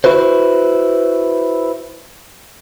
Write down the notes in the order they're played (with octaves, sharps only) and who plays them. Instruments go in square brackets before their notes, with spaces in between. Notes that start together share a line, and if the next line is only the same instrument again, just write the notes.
[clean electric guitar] E4 F#4 B4 C5